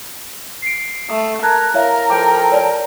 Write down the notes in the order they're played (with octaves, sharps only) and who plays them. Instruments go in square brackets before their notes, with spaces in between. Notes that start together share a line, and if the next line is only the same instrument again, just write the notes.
[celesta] C7 D7
[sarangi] A3 [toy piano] D#6
[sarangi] A#4 [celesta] A5 F#6 G#6
[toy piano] E4 C#5 E5 [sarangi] A#4 [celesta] F5
[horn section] F3 A4 G5 [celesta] A5 [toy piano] D6
[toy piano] C#5 D5